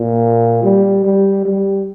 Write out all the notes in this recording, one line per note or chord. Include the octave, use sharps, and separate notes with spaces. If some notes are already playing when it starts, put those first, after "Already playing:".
Already playing: A#2
G3
G3
G3